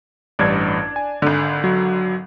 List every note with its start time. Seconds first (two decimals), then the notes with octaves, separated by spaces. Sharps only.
0.39 A1 G2 D4 G#6
0.96 G#5
1.22 G#1 D3
1.64 F#3